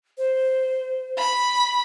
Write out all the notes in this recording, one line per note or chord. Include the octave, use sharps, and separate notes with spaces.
C5
B5